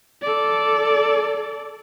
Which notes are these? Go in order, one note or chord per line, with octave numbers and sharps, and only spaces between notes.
A4 D5